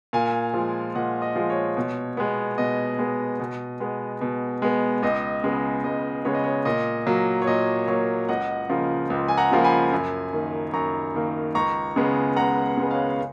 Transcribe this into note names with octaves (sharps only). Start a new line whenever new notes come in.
A#2 F5 G#5
F3 G#3
A#2 D#5 F#5
D#5
F3 G#3
C#5
B2
G#3 B3
B2 D#5
G#3 B3
B2
G#3 B3
B2
G#3 B3
C#2 D#5
C#3 G#3 B3
C#2 D#5
C#3 G#3 B3 C#5
D#5
C#5
A#2 D#5
F#3 A#3
C#5
A#2 D#5
F#3 A#3 C#5 F5
C#2 D#5 F#5
C#3 F3 A#3
C#2
G#5
F#5 A#5
C#3 F3 A#3
G#5 B5
F#2
D#3 A#3
F#2 A#5 C#6
D#3 A#3
C#2 A#5 C#6
C#3 G#3 B3
C#2 F#5 A#5
C#3 G#3 B3
C#5 F5
F5